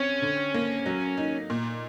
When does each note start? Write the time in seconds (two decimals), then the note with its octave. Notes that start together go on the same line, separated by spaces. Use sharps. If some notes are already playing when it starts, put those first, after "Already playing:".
Already playing: C4 C#4
0.22 D3
0.54 A#3
0.86 F#3
1.17 D#4
1.50 A#2